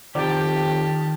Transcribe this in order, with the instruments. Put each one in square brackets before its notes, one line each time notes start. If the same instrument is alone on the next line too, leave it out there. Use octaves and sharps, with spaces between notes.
[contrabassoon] F2 [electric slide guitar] D#3 [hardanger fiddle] G4 A5 [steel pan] D5 G5